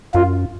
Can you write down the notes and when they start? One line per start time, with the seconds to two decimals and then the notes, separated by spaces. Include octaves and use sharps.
0.14 F#2 F4